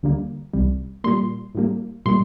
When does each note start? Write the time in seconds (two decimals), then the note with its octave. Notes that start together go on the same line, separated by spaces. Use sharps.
0.03 D2 D3 G3 A#3
0.54 C2 C3 G3
1.04 A#2 G3 A#3 C6
1.55 A2 G3 A#3
2.06 A#2 G3 A#3 C6